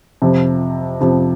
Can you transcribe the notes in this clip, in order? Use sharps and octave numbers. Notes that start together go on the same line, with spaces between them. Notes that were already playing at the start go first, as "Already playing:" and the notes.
F2 C3 F3
F2 C3 F3